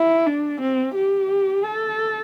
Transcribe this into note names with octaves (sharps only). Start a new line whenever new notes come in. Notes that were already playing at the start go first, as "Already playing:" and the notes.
Already playing: E4
D4
C4
G4
A4